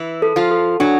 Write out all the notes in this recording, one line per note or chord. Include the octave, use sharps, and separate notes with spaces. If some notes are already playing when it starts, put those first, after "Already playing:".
Already playing: E3 E4
A4
F3 F4
A4
F#3 D4 F#4